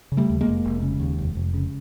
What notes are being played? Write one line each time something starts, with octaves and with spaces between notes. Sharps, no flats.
C#3
G3 A3
D#2
G#3 A#3
F1
F1
C#3
D#2
F1
F1
C#3